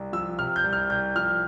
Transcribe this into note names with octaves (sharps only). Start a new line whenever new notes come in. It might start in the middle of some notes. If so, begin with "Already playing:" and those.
Already playing: C2
F3 E6
C3 F6
G6
C2
F6
C2 G6
F3 F6